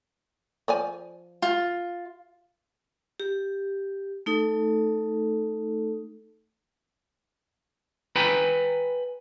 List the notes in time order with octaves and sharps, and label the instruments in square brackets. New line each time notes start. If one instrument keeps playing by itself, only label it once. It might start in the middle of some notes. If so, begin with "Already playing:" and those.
[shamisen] F3 D5 G#5
[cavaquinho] F4
[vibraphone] G4
A3 D#4 A4
[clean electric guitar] B4 G5 G#5 A#5 B5